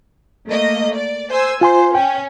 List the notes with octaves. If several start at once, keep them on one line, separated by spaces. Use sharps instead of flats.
A3 A#3 D#5
D5
C5 G#5 E6
F4 C5 G#5 C6
C#4 G5